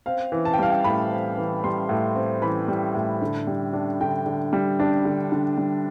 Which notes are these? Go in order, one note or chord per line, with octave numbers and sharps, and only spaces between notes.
C4 F5
E3
A5
G5
G3 F5
G5
A2 B5
C4
E3
G3 C6
A2
C4
E3 B5
G3
A2
D3
G3
D4
D3 G5
D3
G3
D4
D3
D3
G3